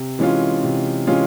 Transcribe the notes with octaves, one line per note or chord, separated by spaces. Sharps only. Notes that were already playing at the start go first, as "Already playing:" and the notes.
Already playing: C3
E3 G#3 C#4 F4
C3
E3 G#3 C#4 F4